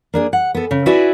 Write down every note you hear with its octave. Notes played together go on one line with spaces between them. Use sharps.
A#3 D4 G#4
F#5
B3 A4
C#3
E4 F#4 B4 D5 E5 G#5